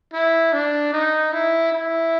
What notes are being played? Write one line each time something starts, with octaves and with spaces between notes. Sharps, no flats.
E4
D4
D#4
E4
E4